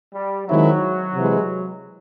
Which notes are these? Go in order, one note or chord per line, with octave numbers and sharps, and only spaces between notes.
G3
D#3 F#3 G#3 C4 E4
C3 E3 G#3